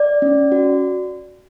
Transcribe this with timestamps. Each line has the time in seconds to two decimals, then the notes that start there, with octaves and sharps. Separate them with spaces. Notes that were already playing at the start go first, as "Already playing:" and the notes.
Already playing: D5
0.22 C#4
0.52 F#4